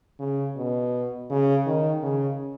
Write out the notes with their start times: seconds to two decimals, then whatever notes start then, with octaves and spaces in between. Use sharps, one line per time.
0.20 C#3
0.57 B2
1.30 C#3
1.66 D#3
2.03 C#3